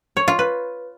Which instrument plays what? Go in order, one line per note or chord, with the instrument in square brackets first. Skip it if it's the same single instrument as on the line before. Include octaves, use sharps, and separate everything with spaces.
[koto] C#5
F4
B4